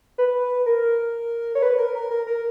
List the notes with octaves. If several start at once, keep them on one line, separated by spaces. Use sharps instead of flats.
B4
A#4
C#5
B4
A#4
A#4
A#4
A#4